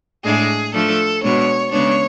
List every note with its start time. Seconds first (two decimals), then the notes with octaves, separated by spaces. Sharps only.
0.24 A2 G#3 D4 G#4
0.73 F3 A3 D4 A4
1.22 B2 G#3 B3 D4 C#5
1.70 C#3 G#3 B3 D4 C#5